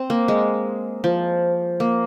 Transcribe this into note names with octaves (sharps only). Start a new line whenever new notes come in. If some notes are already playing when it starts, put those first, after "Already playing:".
Already playing: C4
A#3
G#3
F3
A#3